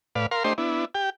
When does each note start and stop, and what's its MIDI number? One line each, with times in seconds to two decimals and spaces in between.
0.15 0.26 45
0.15 0.26 71
0.15 0.26 74
0.15 0.26 77
0.31 0.43 70
0.31 0.43 77
0.31 0.43 84
0.44 0.53 57
0.44 0.53 62
0.44 0.53 67
0.44 0.53 72
0.44 0.53 75
0.44 0.53 84
0.58 0.85 59
0.58 0.85 62
0.58 0.85 64
0.95 1.10 67
0.95 1.10 79